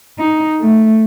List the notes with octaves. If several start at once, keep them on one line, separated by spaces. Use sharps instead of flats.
D#4
A3